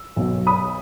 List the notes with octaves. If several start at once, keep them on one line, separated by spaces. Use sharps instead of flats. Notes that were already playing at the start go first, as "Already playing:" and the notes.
Already playing: E6
B1 B2 F#3
B5 D#6